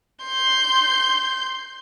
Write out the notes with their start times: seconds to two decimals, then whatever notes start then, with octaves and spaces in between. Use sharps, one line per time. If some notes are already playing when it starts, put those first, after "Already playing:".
0.24 C6 G6